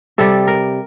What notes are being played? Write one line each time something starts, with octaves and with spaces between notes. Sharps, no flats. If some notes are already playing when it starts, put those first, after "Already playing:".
C3 G3 A4
A#4